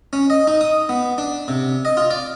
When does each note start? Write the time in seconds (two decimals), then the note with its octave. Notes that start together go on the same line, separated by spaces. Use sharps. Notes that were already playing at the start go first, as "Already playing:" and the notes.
0.13 C#4
0.30 D#5
0.47 D#4
0.61 D#6
0.89 B3
1.18 D4
1.48 C3
1.85 D#5
1.97 F4
2.11 D5